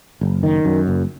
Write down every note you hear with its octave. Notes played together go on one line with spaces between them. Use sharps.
F#1
D#3
F#2
F#1